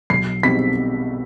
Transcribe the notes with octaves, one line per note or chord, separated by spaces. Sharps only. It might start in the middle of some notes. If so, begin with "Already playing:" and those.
B1 C7
B2 G3 C4 D#4 B6